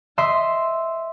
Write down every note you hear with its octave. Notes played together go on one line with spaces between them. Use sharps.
D#5 E5 C6